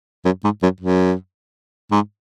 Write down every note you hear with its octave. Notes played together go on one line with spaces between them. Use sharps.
F#2
G#2
F#2
F#2
G#2